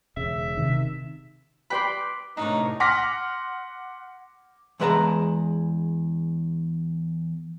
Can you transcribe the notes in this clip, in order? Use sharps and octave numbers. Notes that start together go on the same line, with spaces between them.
E1 C#3 E5
C3 D#3
G4 B4 D5 G5 B5 C6
A2 C3 D4 D#4 A#4 C#5
F#5 C6 D6 F6 A#6 B6
E2 G#3 B4 E5 A5 A#5